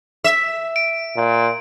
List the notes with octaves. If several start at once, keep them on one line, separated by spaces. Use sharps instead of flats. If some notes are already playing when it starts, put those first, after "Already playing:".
E5
D7
A#2